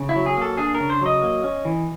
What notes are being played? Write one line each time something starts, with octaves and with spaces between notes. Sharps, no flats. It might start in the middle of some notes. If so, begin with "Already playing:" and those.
Already playing: C#3
E4
F#3
G#4
A#3 A4
D4 G#4
A#4
C#3
C5
F#3 D#5
A#3
C#4
E3